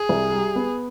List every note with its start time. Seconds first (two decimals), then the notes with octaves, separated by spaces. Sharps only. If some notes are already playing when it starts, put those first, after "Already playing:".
Already playing: G#4
0.09 C2
0.32 G3
0.56 B3